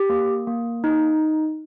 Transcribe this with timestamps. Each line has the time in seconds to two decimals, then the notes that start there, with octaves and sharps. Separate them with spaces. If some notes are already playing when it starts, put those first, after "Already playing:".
Already playing: G4
0.09 A#3
0.47 A#3
0.84 D#4